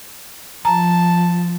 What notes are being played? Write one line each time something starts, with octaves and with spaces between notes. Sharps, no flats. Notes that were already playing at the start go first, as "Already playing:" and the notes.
F3 A5 A#5